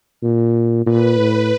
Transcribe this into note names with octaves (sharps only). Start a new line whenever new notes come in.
A#2
A#2 B4
A2